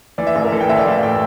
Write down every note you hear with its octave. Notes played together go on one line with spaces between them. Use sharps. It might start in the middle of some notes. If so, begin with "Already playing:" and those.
E3 D5
E5
A1
A#4
E3 A4
G5
A1 E5
D5
E3 F5
A2 G5